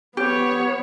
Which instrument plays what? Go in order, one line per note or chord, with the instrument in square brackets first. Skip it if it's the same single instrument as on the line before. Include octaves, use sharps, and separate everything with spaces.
[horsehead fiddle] B3 C#5 [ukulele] G4